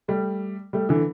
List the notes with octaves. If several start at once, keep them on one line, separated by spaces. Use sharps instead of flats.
G3 A3
G3 A3
D3 E3